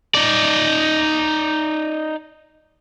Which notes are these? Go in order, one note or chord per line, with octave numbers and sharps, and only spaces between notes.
D#4 D5